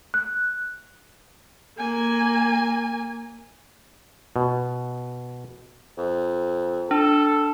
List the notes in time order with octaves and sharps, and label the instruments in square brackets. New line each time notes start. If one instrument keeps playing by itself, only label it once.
[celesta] F#6
[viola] A#3 G#5
[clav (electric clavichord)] B2
[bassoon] F2
[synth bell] D4 [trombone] A4